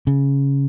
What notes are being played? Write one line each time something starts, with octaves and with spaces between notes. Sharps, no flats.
C#3